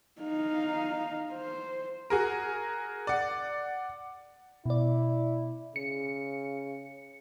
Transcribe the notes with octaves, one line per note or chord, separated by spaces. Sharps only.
D#4 F5
C5
F#4 G#4 A#4
D5 F#5
B2 E4 D5
C#3 C#7